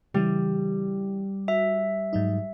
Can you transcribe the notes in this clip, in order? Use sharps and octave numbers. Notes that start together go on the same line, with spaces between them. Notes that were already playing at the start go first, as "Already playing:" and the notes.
C#3 E3 G3
F#4 E5
G#2 F#3 D#4